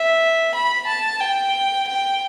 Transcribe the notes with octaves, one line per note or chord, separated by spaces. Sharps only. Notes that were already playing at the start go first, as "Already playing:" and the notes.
Already playing: E5
B5
A5
G5
G5